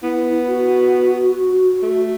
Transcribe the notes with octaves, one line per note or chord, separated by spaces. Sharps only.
B3 E4
F#4
A3